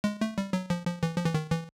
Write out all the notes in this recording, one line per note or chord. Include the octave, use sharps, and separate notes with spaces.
G#3
A3
G3
F#3
F3
F3
E3
F3
E3
D#3
E3